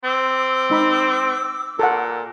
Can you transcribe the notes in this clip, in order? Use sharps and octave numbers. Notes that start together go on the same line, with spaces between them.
C4 D6 E6
G#3 D#4 B5
A#2 A4 F#5